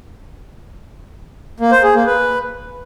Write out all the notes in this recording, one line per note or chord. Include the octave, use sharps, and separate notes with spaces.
A#3
C5
G#4
A#3
B4